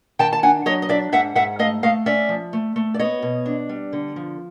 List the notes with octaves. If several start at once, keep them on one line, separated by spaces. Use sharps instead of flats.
D#3 G5 A5
A5
D4 F#5 G#5
F#3 C#5 D#5
D#5
D4 D5 E5
G#2 E5 F#5
G#2 E5 F#5
A3 D#5 F5
A3 D#5 F5
C#4 D5 E5
F3
A3
A3
D5
B3 C#5 D#5
B2
D4
G3
D3
F3